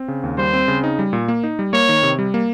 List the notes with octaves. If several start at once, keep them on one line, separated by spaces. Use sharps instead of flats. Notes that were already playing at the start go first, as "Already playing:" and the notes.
Already playing: C4
C#3
D#2
G3 C5
C4
C#3
D#4
G3
A#2
A#3
D#4
G3
A#3 C#5
D#3
C3
G3
A#3